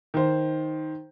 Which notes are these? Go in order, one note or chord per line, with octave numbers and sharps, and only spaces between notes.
D#3 C5